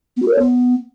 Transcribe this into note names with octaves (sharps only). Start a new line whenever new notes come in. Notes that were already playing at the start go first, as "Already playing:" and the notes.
B3
F#4
A#4
C#5
B3